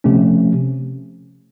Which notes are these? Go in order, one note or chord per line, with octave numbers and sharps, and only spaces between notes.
C3 F3 A3 C#4